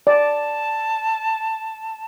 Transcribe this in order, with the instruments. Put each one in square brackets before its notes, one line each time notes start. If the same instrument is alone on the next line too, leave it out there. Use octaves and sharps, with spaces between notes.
[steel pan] D5 [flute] A5